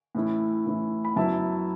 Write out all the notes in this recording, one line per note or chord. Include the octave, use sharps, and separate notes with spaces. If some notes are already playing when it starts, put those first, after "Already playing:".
A2 E3 C#4 E4
A2 E3 C#4 E4
B5
F#2 F#3 B3 E4 E5 A5